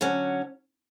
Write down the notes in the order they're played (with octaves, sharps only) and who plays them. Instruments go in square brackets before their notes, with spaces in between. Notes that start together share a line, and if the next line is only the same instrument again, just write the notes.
[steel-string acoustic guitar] D3 F#3 C#4